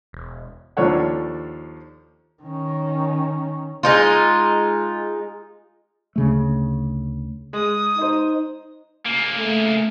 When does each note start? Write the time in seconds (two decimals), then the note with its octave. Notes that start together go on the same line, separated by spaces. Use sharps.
0.13 E1
0.77 D#2 F3 D4 A4 C#5 F#5
2.43 D#3 C#4
3.83 G#3 D#4 F4
6.16 D2 C#3 A3
7.53 G#3 D#6
7.98 D#4 C5 D#5
9.06 C#3 A#3
9.38 A3